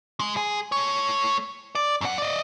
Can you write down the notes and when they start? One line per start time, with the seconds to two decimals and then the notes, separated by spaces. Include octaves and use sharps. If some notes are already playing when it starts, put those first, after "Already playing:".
0.20 G#3
0.37 G#4
0.72 A3 C#5
1.75 D5
2.01 F#2 F#5
2.18 D5 D#5